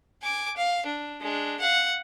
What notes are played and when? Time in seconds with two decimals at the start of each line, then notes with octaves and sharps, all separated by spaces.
0.22 G#5 D6
0.57 F5
0.86 D4
1.20 G#3 D4
1.60 F5 F#5